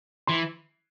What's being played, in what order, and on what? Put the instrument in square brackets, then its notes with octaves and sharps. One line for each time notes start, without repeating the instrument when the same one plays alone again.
[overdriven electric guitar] E3 [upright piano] C6